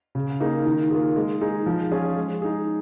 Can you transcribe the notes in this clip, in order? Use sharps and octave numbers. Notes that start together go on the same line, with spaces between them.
C#3
A#3 D#4 G#4
D#3
A#3 F4 G#4
G#3
D#4 G#4
F3
C#4 F4 G#4
G#3
D#4 G#4